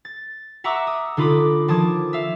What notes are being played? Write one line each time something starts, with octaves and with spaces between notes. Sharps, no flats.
A6
E5 F#5 A#5 C#6 D6 E6
D#6
D3 D#4 F4 B5 D6 D#6
D#3 F3 A5 D6 D#6 G#6
E5 F5